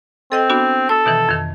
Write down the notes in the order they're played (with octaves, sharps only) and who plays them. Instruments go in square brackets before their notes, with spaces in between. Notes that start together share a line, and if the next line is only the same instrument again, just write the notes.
[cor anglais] C4 [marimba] A4 D#5 G5
[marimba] B3 D4 F#4
[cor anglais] A4 [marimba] E6
[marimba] B2 D#3 E3
F2 D#3